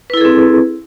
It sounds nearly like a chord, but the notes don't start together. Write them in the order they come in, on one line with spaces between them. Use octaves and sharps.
B4 E4 A4 G#4 C4